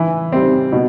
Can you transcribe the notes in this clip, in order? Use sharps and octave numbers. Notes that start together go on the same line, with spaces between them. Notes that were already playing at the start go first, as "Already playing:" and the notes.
Already playing: E3
G3 C4
B2